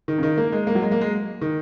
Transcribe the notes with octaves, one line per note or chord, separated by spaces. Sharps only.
D#3
C#3
D#3
A#3
G#3
A#3
F#3
G#3
A#3
G#3
D#3